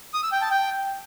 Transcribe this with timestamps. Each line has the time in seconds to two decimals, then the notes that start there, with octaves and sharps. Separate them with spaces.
0.14 D#6
0.23 E6
0.32 G5
0.41 A5
0.51 G5